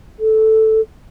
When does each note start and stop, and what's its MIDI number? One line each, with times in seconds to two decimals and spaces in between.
0.20 0.81 69